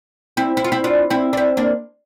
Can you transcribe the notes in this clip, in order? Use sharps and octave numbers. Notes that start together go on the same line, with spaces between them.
C4 E4
E4
F4
C4 E4
D4 F4
C4 E4
D4
C4 E4
A#3 D4